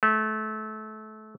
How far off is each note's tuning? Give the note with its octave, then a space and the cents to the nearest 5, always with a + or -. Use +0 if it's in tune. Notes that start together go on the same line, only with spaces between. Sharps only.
A3 -25